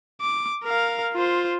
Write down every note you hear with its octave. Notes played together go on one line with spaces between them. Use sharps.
D6
A#4 F5
F4 C5